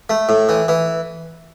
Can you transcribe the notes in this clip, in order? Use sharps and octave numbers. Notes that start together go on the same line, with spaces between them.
A3
A2
E3
E3